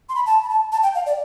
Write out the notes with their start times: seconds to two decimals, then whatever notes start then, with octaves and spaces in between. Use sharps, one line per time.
0.09 C6
0.15 B5
0.26 A5
0.43 B5
0.49 A5
0.72 A5
0.83 G5
0.95 F5
1.06 D5